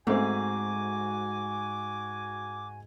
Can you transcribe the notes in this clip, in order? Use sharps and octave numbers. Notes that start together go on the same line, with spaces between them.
G#2 A3 C4 F#4 G#5 D6